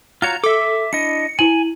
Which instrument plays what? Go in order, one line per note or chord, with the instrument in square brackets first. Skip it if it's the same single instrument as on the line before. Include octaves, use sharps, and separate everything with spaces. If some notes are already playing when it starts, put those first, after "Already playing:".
[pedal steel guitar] F4 F#4 C#5 [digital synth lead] A#5
[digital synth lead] A4 [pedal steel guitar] E5 D6
[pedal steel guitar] D4 E4 D#5 [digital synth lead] C#7
[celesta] E4 F#7 [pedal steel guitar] G#5